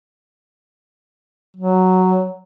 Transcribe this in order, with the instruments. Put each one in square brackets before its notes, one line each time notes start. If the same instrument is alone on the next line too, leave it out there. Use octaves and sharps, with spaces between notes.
[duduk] F#3